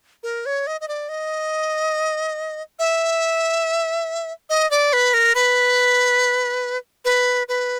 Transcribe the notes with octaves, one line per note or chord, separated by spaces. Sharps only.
A#4
C#5
D#5
D#5
D5
D#5
E5
D#5
D5
B4
A#4
B4
B4
B4